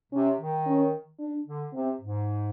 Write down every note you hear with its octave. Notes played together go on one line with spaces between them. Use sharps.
C3 C#4
D#3
C#4
D4
D3
C3 C4
G#2